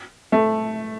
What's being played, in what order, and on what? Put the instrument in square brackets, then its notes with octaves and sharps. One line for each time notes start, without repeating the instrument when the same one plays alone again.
[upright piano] A3